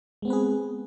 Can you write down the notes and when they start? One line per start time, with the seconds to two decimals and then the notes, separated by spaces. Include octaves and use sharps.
0.22 G#3
0.25 B3
0.28 C4
0.30 B4
0.33 G#4